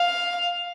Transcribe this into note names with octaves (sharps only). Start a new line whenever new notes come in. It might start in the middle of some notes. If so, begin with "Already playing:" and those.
Already playing: F5